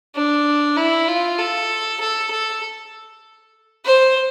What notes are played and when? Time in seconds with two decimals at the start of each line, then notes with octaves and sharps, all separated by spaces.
0.15 D4
0.76 E4
1.08 F4
1.38 A4
2.00 A4
2.31 A4
3.85 C5